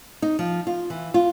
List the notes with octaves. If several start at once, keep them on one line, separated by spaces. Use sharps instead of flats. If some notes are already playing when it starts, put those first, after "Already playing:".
D#4
F3
F4
E3
F4